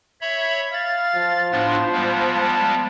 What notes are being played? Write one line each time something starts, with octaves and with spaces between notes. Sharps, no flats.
C#5 E5 B5
F5 A6
F3
A2 B3 D4 C5
G3 G#3 B3
A5